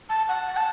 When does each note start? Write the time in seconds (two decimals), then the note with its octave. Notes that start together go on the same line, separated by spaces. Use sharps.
0.09 A5
0.28 F#5
0.47 F#5
0.57 A5